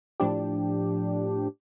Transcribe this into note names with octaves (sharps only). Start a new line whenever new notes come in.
A2 F3 D4 G4